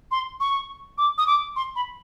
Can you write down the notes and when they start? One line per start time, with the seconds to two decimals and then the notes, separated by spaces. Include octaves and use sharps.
0.11 C6
0.40 C#6
0.98 D6
1.18 D#6
1.27 D6
1.56 C6
1.76 B5